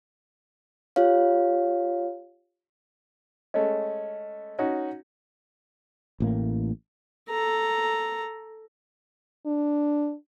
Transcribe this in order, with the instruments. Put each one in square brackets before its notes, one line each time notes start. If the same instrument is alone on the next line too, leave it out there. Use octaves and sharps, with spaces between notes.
[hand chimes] F4 G4 C#5 F5
[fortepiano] G#3 A3 C#4 [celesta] D#5
[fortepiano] C#4 D#4 F#4
[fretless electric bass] A1 A2 A#3
[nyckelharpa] A4 A#5
[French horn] D4